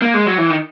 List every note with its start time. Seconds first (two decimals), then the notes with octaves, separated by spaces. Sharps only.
0.02 A#3
0.14 G#3
0.26 F#3
0.38 E3
0.50 D#3